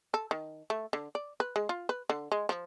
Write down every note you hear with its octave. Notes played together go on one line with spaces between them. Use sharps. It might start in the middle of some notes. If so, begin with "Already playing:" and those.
A4
D#3
A3
D3
D5
B4
G#3
F4
B4
D3
G#3
F3